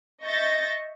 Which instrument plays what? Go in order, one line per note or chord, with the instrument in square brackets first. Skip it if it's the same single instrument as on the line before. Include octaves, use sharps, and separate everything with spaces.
[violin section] D#5 E5 C#6 G6 A6 A#6